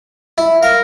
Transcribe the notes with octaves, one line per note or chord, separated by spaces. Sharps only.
E4
A#4 F5